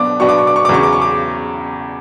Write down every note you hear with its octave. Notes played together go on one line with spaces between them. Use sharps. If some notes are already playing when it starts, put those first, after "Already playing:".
Already playing: B2 F#3 B3 D4 D6
B2 F#3 B3 D4 C#6
D6
C#6
D6
C#6
D6
E2 C#3 F#3 C#4 C#6
D6
C#6
D6